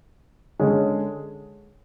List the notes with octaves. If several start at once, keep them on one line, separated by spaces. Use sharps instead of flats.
D3 G#3 C#4